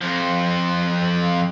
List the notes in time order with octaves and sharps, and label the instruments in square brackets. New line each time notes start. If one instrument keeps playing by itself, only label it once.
[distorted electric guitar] F2 F3